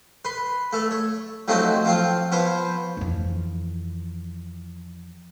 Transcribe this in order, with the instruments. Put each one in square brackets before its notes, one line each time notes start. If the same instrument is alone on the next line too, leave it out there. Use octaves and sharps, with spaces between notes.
[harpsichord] B4 C6
A3 A4
C#5
F3 F#3 A3 C4 D#4 F#4
F3 C4 F4
F3 B3 C5 C#5
[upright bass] F2 E3